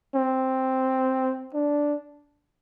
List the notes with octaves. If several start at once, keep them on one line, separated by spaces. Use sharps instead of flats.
C4
D4